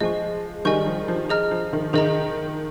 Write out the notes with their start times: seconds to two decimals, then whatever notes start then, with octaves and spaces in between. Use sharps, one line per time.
0.01 F3 G#3 D#5 G#5 C#6
0.65 D#3 G3 D#5 G#5 C#6 G6
0.87 F3
1.08 F3
1.29 G#4 D#5 A#5 F6
1.51 F3
1.73 D#3
1.93 D#3 G#4 D#5 A#5